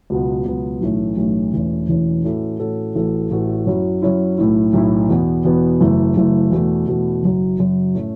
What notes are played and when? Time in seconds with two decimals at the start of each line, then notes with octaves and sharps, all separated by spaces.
0.10 C#2 B2 F#3 B3
0.46 C#2 B2 F#3 B3
0.81 B1 A2 E3 A3 C#4
1.17 B1 A2 E3 A3 C#4
1.53 E1 E2 E3 A3 C#4
1.89 E1 E2 E3 A3 C#4
2.24 A2 E3 C#4 F#4 A4
2.60 A2 E3 C#4 F#4 A4
2.95 A1 A2 A3 F#4 A4
3.31 A1 A2 A3 F#4 A4
3.67 F#2 F#3 C#4 E4
4.02 F#2 F#3 C#4 E4
4.38 B1 A2 A3 E4
4.73 B1 A2 A3 E4
5.09 E2 B2 B3
5.45 E2 B2 B3
5.80 F#1 F#2 E3 A3
6.16 F#1 F#2 E3 A3
6.52 E2 B2 A3
6.88 E2 B2 A3
7.23 F#1 F#2 F#3
7.59 F#1 F#2 F#3
7.94 A2 A3 C#4